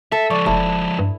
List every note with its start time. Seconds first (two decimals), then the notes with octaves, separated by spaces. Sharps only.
0.12 A4 E5
0.30 F3 G#3 D5 C#6
0.46 F1 E4 A5
0.99 G2